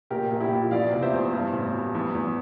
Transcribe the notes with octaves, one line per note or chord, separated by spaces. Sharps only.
A#1 G4 A#4
A#1
E4 G4
A#2
E2 D5 F5
C3
C5 E5
E2
G2
A1
G3
E2
E2